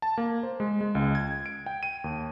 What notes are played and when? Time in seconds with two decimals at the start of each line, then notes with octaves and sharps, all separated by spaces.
0.02 A5
0.18 A#3
0.43 C5
0.60 G#3
0.81 G#3
0.95 C#2
1.15 G#6
1.46 D7
1.66 G5
1.83 D#7
2.04 D#2